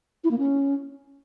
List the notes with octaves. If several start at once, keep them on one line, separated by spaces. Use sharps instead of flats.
E4
A#3
C#4